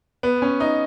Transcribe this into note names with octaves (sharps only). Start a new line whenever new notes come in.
B3
C#4
D#4